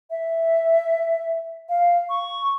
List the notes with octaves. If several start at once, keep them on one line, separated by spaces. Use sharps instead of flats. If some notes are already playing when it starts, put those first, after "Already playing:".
E5
F5
C#6